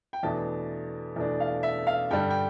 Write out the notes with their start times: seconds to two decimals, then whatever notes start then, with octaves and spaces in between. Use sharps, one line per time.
0.13 G5
0.23 E2 B2 A3 D4 A5
1.16 E2 B2 A3 D4
1.40 F5
1.63 E5
1.87 F5
2.10 G2 D3 G3 G5
2.30 G5